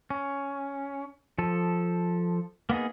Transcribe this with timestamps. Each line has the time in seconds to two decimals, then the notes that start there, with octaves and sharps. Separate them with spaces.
0.10 C#4
1.38 F3 A4
2.70 A#3 B3 D#4 G#4